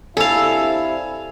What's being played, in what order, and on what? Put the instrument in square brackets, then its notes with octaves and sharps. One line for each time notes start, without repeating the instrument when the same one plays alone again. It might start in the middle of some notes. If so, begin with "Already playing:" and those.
[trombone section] C3 D4 E4 [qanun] A4 F5 [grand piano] G#5 E6